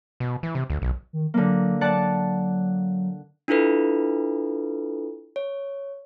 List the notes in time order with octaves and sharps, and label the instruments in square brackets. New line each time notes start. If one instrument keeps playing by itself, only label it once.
[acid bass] B2
E3
C3
D2
B1
[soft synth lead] D#3
[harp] D3 A#3 [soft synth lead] F#3
[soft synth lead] F#3 [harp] D5 F#5 A5
[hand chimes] D4 E4 F4 A4 B4
C#5